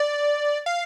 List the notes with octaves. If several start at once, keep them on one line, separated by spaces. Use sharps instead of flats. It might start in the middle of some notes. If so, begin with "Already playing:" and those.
Already playing: D5
F5